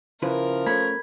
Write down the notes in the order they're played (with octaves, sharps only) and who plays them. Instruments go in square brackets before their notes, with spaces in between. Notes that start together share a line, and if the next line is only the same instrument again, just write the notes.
[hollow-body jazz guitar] C#3 E4 B4 [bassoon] F3 [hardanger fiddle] A#4
[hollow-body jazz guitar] A3 C#4 [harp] B5 G#6